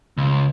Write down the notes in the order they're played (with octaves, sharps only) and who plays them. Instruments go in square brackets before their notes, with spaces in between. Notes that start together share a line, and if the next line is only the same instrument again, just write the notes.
[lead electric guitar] C#2